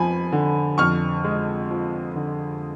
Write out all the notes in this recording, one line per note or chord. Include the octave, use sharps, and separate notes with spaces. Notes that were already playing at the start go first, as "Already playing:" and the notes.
Already playing: F2 F3 G#5 B5
D3
F2 C#6 F6
G#3
F3
D3